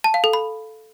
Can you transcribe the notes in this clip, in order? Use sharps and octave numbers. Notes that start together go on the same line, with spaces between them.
A5
F5
A4
B5